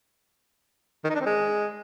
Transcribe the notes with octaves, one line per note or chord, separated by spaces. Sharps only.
D#3
D#4
D4
C4
G#3